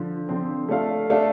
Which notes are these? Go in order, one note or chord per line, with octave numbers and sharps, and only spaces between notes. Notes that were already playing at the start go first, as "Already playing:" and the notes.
Already playing: D3 F3
D3 F3 C4
A3 D4 A4 F5
A3 D4 A4 F5